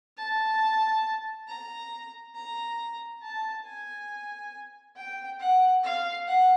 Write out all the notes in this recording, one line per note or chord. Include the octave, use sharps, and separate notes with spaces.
A5
A#5
A#5
A5
G#5
G5
F#5
F5
F#5